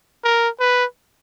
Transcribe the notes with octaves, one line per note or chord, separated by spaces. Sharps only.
A#4
B4